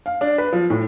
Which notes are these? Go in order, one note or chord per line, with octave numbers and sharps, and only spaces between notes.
F5
D4
B4
F3
A2